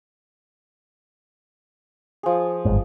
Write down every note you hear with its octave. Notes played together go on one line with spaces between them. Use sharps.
F3 G#4
G1 G#2